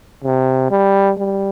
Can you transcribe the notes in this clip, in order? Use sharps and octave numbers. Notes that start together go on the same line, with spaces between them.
C3
G3
G3